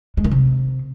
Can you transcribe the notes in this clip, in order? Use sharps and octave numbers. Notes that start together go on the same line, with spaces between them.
G#3
D#3
C3